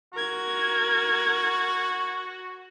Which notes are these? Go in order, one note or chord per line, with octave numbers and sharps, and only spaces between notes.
F#4 A#4 G#6